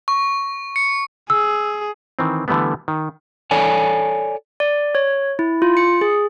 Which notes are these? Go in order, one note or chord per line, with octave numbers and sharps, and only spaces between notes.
C#6
C#7
G#4 E6
D#3 E3 C4
D3 E3 G3 A3 B3
D#3
A4 C#5 D5 G#5
D5
C#5
E4
F4
C#7
G#4